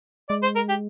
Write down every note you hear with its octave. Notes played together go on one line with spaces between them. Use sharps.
G#3 D5
C5
A#4
G4